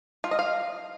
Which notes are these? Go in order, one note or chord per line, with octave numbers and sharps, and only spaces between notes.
F4
D#5
F5